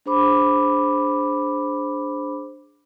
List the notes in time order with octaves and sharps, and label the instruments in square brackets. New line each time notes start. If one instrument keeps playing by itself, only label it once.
[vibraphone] D4 G#4 C5 B5 D6